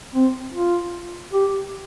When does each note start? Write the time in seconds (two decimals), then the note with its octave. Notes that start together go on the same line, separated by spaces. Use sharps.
0.15 C4
0.54 F4
1.33 G4